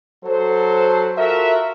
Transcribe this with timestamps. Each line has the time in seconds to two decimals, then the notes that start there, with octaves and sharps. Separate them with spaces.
0.25 F#3 A4 C5
1.17 F4 F#4 A4 A#4 E5